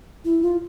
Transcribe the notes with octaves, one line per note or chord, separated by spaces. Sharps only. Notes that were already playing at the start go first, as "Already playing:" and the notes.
E4
F4